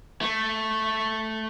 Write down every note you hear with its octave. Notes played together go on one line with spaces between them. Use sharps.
A3